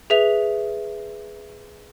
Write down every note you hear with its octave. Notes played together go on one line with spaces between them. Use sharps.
G#4 B4 E5 F7